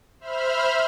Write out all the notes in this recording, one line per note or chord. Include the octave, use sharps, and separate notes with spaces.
C5 E5 B5 F6